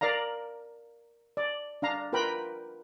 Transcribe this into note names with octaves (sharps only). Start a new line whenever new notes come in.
A#4 D5 F5 A#5
D5
D4 F5 A#5
F4 A#4 B4 G5 B5